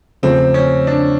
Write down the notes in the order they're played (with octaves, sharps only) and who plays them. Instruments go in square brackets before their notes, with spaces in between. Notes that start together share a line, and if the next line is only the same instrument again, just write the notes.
[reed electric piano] E2 C#3 F3 A3 [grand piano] C4
[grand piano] C#4
D4